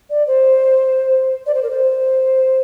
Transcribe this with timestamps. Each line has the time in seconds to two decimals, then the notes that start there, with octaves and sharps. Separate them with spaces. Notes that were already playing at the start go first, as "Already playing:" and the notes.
0.10 D5
0.27 C5
1.46 D5
1.54 C5
1.63 A#4
1.70 C5